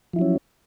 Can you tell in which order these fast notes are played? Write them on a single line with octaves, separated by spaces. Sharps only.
F3 E4 F#3 C#4